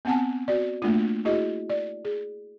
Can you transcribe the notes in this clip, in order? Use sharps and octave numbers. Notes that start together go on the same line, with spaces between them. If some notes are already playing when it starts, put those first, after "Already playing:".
B3 C4 F#5 G#5 A5
F#4 D5
A3 A#3 D4 F4
E4 F#4 G#4 D#5
D5
G#4